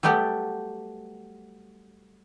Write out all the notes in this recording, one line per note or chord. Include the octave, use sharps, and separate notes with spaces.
F#3 G3 A3 B3 G4